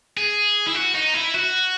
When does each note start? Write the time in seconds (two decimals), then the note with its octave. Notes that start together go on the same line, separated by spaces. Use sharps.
0.17 G#4
0.68 E4
0.75 F#4
0.95 D#4
1.14 E4
1.34 F#4